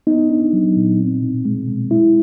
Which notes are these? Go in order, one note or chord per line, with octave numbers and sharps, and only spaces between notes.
B3 D#4
D4
F#3
A#2
C4
B2
G#3
B2
G#3 E4